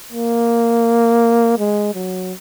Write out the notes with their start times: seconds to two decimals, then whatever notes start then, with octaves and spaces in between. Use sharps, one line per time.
0.13 A#3
1.59 G#3
1.95 F#3